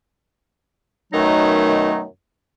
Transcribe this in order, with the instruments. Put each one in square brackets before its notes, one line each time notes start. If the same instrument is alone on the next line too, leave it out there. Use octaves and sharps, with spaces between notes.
[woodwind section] F#2 B2 D#3 F#3 A3 D#4